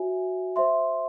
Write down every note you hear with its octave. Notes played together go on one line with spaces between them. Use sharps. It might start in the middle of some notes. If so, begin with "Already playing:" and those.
Already playing: F#4 C#5 E5 G#5
C5 E5 C6